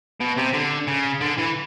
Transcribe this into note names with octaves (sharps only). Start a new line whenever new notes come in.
B2
C3
D3
C#3
D3
E3